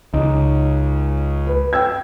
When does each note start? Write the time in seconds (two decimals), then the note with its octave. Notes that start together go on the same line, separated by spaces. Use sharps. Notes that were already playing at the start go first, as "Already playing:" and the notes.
0.14 C#2 D#4
1.47 B4
1.73 G5 E6 G#6